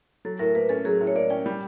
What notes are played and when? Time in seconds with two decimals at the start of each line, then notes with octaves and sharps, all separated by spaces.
0.25 F#3 A4
0.39 A2 A#4
0.55 A#3 B4
0.69 C#4 A4
0.85 F#3 G#4
1.01 A2
1.07 C#5
1.15 A#3 D5
1.30 C#4 G5
1.46 G3